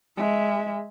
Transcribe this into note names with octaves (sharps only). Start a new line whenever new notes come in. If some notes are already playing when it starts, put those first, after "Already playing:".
G#3 E5